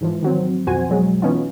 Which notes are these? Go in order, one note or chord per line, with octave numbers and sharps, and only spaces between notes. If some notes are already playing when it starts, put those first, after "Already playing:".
G#2 E3 F3
D#3 F#3 C4
B1 F2 F#4 C5 G#5
B2 F#3 G#3
E3 B3 C#4 D#4 F4